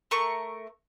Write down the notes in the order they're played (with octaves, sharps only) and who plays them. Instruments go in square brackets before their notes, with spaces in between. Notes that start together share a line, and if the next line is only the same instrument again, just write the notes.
[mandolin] A3 A#4 C#6